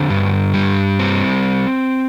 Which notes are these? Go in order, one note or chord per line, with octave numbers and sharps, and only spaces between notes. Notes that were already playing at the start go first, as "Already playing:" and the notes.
Already playing: D3 C4
G2
G3
C4